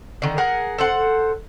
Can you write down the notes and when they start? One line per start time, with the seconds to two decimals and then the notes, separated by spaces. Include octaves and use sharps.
0.22 D3 D#3
0.38 G#4 A#4 F#5
0.78 A4 C5 F#5